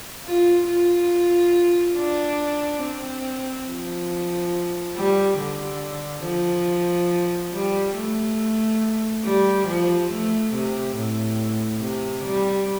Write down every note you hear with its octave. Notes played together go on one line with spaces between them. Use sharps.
F4
F4
D4
C4
F3
G3
D3
F3
G3
A3
G3
F3
A3
C3
A2
C3
G3